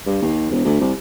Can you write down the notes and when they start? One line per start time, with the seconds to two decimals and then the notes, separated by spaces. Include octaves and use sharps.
0.06 G2
0.22 D#2
0.50 E1
0.65 D2
0.80 C2